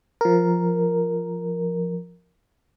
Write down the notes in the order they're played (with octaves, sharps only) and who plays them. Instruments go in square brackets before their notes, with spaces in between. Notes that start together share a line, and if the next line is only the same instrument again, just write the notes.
[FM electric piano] F3 A#4